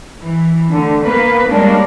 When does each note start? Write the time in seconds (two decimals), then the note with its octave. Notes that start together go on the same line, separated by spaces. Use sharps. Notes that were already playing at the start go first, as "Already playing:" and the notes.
0.20 E3
0.70 D3 A3
1.02 A#3 B3 B4
1.49 G3 G#3 A#3 C#4 D4